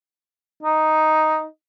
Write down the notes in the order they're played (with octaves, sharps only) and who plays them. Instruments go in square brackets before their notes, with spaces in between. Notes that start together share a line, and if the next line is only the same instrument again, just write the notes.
[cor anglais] D#4